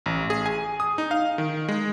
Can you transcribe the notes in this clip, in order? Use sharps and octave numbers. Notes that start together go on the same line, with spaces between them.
A1
G#4
G#5
D#6
D#4
F5
D#3
G#3